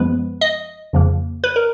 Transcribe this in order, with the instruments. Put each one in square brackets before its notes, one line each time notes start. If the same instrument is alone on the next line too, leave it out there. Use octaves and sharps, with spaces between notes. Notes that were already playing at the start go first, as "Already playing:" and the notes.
Already playing: [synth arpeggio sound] F#2 F3 G#3 B3 B4
D#5
F2 C#3 F3 A#3
B4
A#4